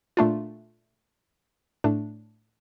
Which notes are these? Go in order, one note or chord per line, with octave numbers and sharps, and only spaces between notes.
A#2 A3 D4 F4
A2 A3 D4